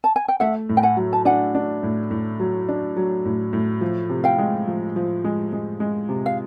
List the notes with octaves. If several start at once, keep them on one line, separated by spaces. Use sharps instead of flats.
A5
G#5
G5
A3 E5 F#5
A2
G5
F#5 G#5
F#3
A5
D4 F#5 G#5
D4
A2
A2
F#3
D4
F#3
A2
A2
F3
C3
F5 G5
G#3
F3
F3
G#3
G#3
G#3
C3
F5